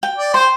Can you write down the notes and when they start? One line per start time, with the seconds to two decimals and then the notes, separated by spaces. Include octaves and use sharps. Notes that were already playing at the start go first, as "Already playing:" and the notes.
0.03 G5
0.18 D5
0.34 C5 C6